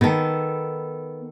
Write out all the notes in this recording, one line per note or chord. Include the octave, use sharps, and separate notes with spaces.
D#3 B3 A4